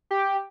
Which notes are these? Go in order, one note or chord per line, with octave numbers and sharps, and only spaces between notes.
G4